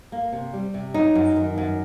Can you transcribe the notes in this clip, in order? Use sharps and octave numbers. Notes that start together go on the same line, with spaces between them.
A#3
C3
G3
C3
F#3 D#4
F#2
D#3
F#2